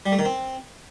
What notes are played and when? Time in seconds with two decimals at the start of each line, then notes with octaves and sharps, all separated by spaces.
0.06 G3
0.12 A3
0.19 D#3
0.25 C4